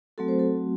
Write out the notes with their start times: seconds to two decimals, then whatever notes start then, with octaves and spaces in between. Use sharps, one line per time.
0.18 F#3 A3 C4 F#4 A4
0.28 C5
0.39 A4